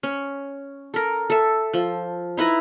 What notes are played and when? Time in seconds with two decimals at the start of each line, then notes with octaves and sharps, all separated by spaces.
0.03 C#4
0.94 A4 A#4
1.30 A4 E5
1.73 F3
2.37 D#4 E4 B4 A#5